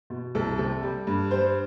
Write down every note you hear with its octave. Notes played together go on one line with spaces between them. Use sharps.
B2
C2 A4
C3 A4
G3
G2
G3 C5